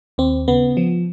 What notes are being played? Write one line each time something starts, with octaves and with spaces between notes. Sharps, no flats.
D#2 C4
C#3 B3
F3